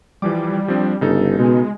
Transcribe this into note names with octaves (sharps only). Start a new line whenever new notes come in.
E3 F3 G3 D6
F3 C4 D4
G1 C#3 D#4 A4
B2 G#3